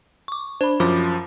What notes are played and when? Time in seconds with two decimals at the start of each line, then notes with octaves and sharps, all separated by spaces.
0.28 C#6 D6
0.61 D4 C5 B5
0.80 F#2 F3 B5 D6